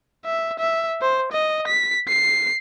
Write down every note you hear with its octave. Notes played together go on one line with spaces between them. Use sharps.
E5
E5
C5
D#5
B6
C7